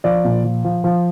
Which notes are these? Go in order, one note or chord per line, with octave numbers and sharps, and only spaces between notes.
F3 D5
A#2
F3
F3
F3